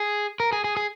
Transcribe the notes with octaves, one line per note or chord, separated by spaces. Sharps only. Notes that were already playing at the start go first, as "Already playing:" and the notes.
Already playing: G#4
A#4
G#4
G#4
G#4